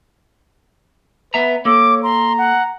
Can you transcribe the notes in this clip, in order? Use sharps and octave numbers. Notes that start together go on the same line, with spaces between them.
B3 B4 E5 A#5
A#3 A4 C#5 D6
A#5 C6
F#5